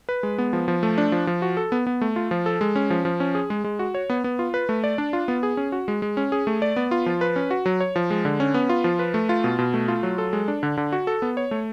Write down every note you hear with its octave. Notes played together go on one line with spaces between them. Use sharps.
B4
G#3
B3
F3
F3
A3
D4
F3
F3
F#4
A4
B3
B3
A3
F4
F3
A4
G#3
C#4
F3
F3
C#4
G#4
G#3
G#3
F#4
C#5
B3
B3
F4
B4
A3
D5
D4
F4
B3
G#4
C#4
F#4
G#3
G#3
C#4
G#4
A3
D5
B3
F4
F3
B4
C#4
F#4
F#3
C#5
F3
G#3
D3
C#4
B3
F4
F3
B4
A3
F4
B2
B2
A3
F4
F#3
A4
G#3
D4
D3
D3
F#4
A4
B3
C#5
A3